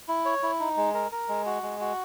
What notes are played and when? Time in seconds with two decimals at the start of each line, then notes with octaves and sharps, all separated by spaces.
0.08 E4
0.25 C#5
0.43 E4
0.60 D#4
0.77 G#3
0.94 A#4
1.12 A#4
1.29 G#3
1.46 F#4
1.63 G#3
1.81 F#4